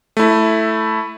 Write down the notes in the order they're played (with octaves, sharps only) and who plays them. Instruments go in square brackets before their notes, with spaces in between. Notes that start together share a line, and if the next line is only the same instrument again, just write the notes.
[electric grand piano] A3 E4